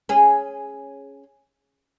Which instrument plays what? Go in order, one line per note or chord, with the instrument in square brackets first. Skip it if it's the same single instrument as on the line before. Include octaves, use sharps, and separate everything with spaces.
[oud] C#4 G#4